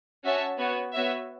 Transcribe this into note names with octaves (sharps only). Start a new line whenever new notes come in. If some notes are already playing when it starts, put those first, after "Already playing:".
C#4 F#4 C#5 E5 A5
B3 F#4 C#5
B3 F#4 C#5 E5